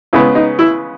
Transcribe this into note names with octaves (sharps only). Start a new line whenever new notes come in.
C#3 G#3 B3 E4
D#4
E4